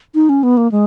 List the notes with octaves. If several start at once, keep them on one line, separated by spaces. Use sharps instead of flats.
D#4
C#4
B3
A#3
G#3